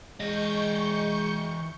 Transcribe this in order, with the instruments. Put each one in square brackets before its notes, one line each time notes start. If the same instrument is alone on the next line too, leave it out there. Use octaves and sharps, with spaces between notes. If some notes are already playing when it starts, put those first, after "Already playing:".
[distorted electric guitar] E3 D#5 [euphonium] G#3 [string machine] C#6 G6 C#7